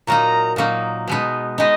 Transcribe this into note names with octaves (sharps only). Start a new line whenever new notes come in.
A#2 F#3 A#3 D#4 A#5
A#2 F#3 A#3 D#4
B2 G#3 B3 D#4
G#3 B3 D#4 D#5